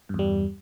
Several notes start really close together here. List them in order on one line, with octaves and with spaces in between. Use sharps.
G2 E2 G3